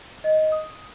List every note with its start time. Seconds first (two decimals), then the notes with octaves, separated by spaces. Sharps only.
0.24 D#5
0.52 D#6